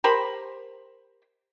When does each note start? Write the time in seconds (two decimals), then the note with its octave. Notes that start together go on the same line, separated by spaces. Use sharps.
0.04 G4 A#4 C5 B5